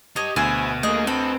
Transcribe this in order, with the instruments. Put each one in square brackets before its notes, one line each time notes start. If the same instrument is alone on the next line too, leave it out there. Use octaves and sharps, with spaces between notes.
[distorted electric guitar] G4 A5 [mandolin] C#5 D#5
[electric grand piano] D2 [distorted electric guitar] B2 [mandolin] G#4 C5 E5
[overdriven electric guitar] A3 A#3 [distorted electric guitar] G#4 [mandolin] D#5
[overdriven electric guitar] C4 [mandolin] A4 [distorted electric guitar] B4 D#5